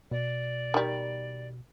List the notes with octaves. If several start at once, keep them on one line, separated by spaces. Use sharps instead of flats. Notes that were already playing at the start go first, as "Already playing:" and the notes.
B2 D5
D#3 G3